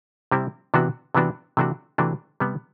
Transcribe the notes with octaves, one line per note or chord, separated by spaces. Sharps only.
C3 G3 C4 E4
C3 E3 B3 D4 F#4
C3 E3 B3 D4 F#4
C3 E3 A3 D4 F#4
C3 E3 A3 D4 F#4
C3 G3 B3